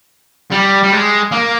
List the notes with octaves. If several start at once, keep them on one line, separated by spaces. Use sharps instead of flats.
G3
G3
G#3
A#3